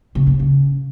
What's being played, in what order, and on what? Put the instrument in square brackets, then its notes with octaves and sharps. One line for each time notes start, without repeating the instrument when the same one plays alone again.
[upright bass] C#3
B2
C#3